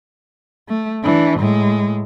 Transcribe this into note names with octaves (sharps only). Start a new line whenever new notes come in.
A3
E3 D4
A2 G#3